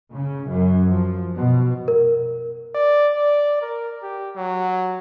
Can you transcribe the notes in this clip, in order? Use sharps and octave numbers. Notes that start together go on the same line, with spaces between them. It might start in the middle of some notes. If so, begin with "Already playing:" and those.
C#3
F#2
F3
B2
A#4
D5
D5
A#4
G4
F#3